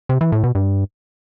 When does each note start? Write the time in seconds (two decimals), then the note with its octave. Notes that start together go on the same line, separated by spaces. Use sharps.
0.09 C3
0.21 E3
0.32 A2
0.44 B2
0.55 G2